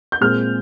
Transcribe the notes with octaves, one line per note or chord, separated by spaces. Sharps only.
G6
A#2 G#3 C4 F6